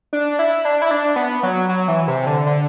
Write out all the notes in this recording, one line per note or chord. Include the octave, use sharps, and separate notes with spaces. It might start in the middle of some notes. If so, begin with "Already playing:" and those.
D4
E4
D4
E4
D4
B3
F#3
F#3
E3
C3
D3
D3